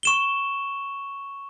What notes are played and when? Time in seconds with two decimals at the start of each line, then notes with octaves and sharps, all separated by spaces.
0.03 C#6 E7 G7